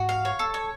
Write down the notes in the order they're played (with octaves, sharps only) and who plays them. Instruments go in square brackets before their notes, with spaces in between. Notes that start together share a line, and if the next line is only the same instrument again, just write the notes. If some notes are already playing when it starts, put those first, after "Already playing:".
Already playing: [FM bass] G#2 [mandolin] F#4
[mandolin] F5
C#5
A4
C#5